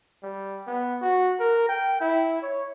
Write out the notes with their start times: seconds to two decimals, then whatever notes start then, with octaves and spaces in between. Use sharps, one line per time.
0.23 G3
0.67 B3
1.01 F#4
1.40 A#4
1.69 G5
2.01 E4
2.42 C#5